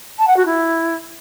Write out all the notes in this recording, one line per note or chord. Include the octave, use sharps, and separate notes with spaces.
A5
F#5
F#4
E4